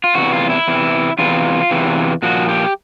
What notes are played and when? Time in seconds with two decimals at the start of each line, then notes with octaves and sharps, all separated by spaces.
0.04 F4
0.15 E2 C3 E3 F#4
0.32 F4
0.50 E4
0.68 E2 C3 E3
1.19 E2 C3 E3 F4
1.71 E2 C3 E3
2.22 A#2 F3 F#4
2.49 G4